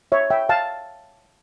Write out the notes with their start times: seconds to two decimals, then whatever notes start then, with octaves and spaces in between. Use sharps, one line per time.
0.12 C#5 E5
0.30 E5 G5
0.49 F5 A5